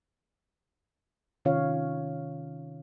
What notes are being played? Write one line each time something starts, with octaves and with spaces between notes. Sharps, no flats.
C3 D#3 C#4 F4 C#5 F5